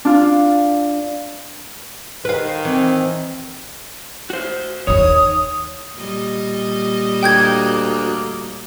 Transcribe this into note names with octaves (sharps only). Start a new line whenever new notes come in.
D4 F4
D#3 B4 F5
E3 C4
F#4 C5
D#2 D#3 C#5 D#6
A#2 G3 D#5
D2 A#3 G5 G6 G#6